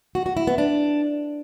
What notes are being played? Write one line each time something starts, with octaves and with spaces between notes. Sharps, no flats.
F#4
F#4
E4
B3
D4